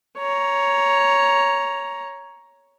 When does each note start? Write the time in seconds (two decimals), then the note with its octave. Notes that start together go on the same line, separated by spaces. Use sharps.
0.19 C#5 A#5